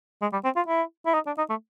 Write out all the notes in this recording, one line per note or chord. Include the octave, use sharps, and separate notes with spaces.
G#3
G3
C4
F4
E4
E4
D#4
D4
D#4
A3